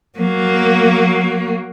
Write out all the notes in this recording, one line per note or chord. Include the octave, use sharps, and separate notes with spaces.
F#3 A#3